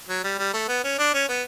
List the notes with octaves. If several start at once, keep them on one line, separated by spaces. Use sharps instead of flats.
F#3
G3
G3
A3
B3
C#4
D4
C#4
B3